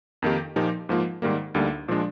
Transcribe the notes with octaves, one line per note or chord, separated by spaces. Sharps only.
F2 D#3 A#3 D#4 G4
A#2 F3 A#3 D#4 G4
G#2 F3 A#3 F4
G#2 D#3 G3 A#3
D2 D3 G3 A#3 D#4
A#2 F3 G#3 D4